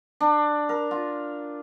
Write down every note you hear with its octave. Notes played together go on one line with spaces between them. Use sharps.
D4
A#4
F4